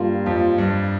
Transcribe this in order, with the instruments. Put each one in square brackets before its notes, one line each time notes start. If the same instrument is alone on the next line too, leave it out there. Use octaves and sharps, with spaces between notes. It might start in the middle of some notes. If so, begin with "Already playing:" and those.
Already playing: [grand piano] G2 [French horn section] G3 A#3 F4
[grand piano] F2
G2